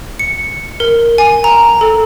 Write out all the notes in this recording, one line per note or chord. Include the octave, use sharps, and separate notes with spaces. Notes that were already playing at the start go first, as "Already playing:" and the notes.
C#7
A#4
G#5
A#5
A4